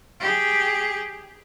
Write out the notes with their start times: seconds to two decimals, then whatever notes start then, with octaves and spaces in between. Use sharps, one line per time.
0.20 G4 G#4